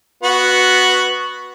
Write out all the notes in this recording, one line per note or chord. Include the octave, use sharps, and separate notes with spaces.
B3 F#4